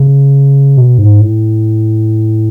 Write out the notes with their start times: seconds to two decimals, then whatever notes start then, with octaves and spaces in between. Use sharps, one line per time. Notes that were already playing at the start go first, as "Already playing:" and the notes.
Already playing: C#3
0.77 B2
0.98 G#2
1.21 A2